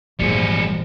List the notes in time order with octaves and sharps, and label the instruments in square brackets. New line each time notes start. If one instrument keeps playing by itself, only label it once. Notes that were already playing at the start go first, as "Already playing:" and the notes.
[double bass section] G#1 A#2 F3 [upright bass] F2 E3 [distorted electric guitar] G3 G#4 [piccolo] C#7